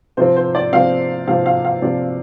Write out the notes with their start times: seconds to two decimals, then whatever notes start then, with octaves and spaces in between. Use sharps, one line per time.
0.17 C3 F3 C4 C5
0.37 C5
0.55 D5
0.72 C3 F3 C4 F5
1.28 C3 F3 C4 F5
1.46 F5
1.65 F5
1.82 C3 F3 C4 D5